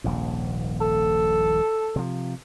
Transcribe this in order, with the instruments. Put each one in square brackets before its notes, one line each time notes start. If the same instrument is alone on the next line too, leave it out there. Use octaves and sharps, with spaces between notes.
[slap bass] D#1 A#1 G#2
[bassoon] A4
[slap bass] C3 F3